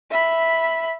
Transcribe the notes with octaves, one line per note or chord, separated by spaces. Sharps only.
E5 B5